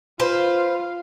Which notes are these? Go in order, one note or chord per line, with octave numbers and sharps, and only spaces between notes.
F4 B4 C5 F5